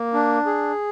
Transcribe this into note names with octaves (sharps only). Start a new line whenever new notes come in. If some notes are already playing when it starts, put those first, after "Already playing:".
Already playing: A#3
D4
G#4